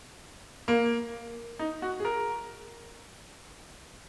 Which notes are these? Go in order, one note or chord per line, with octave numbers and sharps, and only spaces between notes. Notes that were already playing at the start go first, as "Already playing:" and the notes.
A#3
D#4
F#4
G#4
A#4